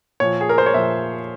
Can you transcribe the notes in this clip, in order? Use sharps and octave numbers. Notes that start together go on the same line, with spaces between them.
A#2 F3 C#5
G#4
A#4
C5
C#5
A#2 F3 E5